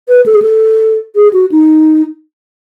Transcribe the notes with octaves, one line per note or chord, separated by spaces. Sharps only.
B4
A4
G#4
A4
G#4
F#4
D#4